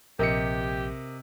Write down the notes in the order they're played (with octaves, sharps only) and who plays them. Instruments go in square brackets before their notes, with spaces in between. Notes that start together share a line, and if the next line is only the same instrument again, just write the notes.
[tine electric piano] A#1 [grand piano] C3 D#5 C#7 [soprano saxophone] G4 [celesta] A#4